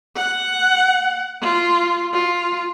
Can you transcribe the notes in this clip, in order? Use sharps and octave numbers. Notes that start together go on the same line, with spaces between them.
F#5
F4
F4